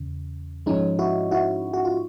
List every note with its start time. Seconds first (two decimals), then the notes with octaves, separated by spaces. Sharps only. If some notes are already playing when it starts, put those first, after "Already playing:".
Already playing: E2 C#3
0.66 G#2 F3 G#3 C#4 D#4
0.99 E4 F#4
1.31 E4 F#4
1.74 F#4
1.85 F4